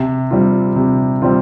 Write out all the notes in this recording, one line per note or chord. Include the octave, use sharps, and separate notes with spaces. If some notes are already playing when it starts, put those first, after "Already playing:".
Already playing: C3
G3 C4 F4
C3
G3 C4 F4